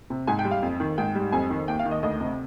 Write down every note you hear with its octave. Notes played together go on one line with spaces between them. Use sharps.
C3
G#2 G#5
G5
G3
F5
F2
D#3
G#2 G5
G3
F2 G#5
D#3
D#2 G5
F5
D#3
D#5
D2 D#5
C3